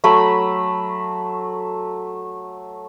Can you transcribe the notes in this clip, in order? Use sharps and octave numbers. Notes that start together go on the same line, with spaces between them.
F#3 A3 B5